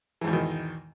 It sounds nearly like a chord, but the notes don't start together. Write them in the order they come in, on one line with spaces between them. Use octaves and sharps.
E3 G#2 E2 B2 D#3